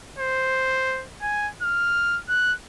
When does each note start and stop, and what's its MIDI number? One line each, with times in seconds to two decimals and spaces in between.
0.19 1.04 72
1.22 1.49 80
1.62 2.19 89
2.29 2.53 90